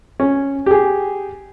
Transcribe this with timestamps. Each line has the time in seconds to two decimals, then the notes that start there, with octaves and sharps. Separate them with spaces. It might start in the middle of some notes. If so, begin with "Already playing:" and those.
0.20 C#4
0.66 G4 G#4